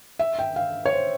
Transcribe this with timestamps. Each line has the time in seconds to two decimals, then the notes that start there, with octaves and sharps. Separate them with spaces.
0.19 E5
0.39 G5
0.56 F5
0.86 C#5
0.93 C5